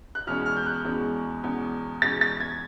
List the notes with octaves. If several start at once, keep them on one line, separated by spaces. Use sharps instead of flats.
F#6
E2 B2 G#3 C#4 F6
F6
G6
F#6
E2 B2 G#3 C#4
E2 B2 G#3 C#4
E2 B2 G#3 C#4 A6
A6
G#6